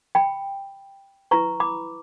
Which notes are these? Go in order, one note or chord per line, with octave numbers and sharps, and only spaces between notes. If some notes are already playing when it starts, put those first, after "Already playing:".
G5 B5
E4 B4 A#5 C#6
B5 D6